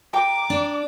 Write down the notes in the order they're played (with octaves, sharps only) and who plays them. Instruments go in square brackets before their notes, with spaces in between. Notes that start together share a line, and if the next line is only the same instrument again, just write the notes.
[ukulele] G5 A#5 [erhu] D6
[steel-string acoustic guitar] D4